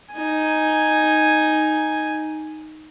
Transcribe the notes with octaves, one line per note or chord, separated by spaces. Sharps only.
D#4 G#5